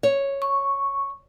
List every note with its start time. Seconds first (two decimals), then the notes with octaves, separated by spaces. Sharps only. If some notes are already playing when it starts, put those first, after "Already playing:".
0.03 C#5
0.42 C#6